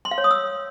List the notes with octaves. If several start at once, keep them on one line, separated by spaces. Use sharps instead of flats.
C6
F5
C#5
D#6
E6